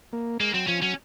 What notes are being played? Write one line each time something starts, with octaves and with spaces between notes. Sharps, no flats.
A#3
G#3 A#3
F#3 C4
F3 C#4
F#3 C#4